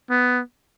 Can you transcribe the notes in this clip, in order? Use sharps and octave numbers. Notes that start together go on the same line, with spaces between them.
B3